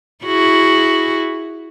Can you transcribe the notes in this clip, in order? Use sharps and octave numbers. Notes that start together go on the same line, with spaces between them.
E4 F#4 G#4